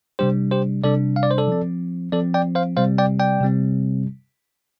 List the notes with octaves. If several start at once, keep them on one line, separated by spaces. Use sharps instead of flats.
C3 G3 D4 G4 C5
G4 C5
C3 G3 D4 A4 D5
F5
D5
C5
A4 D5
F3 C4
F3 C4 A4 D5
D5 G5
C5 F5
C3 G3 C4 C5 F5
D5 G5
D5 G5
C3 G3 C4